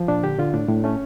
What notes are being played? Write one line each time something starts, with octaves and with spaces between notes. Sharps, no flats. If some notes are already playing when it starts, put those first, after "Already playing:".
Already playing: F3
A#2 D4
D3 G4
D3 F4
A2 D4
A2
A3 C#4